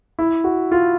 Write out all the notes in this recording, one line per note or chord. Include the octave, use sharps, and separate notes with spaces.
E4
F#4
F4